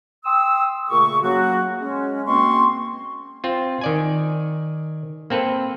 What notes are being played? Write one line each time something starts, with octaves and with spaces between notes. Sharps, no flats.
G5 C6 D#6 E6
A#2 C#3 A3 G#4 C#6
C#3 F#3 A#3 F#4
G#3 C#4
B2 A#3 C4 C#4 C6 C#6
C4 F4
D#3 D5 G#5
A#3 C4 A4 B4